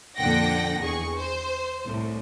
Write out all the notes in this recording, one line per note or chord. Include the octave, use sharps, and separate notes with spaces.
F2 A#2 D3 F#5 G5 A#6
E2 G#4 C#6
C5
C2 A2